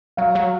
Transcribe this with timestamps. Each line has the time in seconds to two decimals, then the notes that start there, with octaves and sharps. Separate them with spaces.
0.17 F#3 F5
0.35 F#3